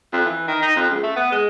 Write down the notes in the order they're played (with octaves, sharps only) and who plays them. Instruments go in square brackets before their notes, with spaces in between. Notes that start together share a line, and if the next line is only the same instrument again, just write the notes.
[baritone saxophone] F2
E3
D#3
D#4
F2
C#2
A3
B3
G#3